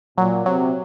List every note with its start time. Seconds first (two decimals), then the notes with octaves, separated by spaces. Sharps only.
0.18 A#2 F#3
0.46 C3 F#3